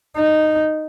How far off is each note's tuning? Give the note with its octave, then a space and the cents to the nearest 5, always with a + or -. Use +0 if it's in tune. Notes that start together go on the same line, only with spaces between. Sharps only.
D#4 -10